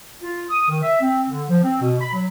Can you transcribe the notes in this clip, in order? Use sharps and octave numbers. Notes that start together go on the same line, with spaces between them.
F4
D#6
D#3
E5
C4
D3
F3
C4
B2
B5
F#3